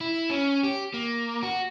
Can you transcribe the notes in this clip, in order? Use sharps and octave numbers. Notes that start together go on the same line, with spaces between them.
E4
C#4
G4
A#3
F#4